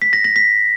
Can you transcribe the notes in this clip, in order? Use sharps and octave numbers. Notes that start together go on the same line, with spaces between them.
B6
A#6
A#6
B6